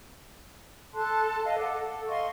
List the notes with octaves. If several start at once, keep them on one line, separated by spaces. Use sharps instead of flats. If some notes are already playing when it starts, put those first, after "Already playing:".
A4 A5 C6 F#6
D#5 F5
A4 F#5 D6
A4
D#5 F5 C6 C#6